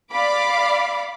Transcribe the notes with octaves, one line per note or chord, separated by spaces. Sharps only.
D5 F5 B5 D6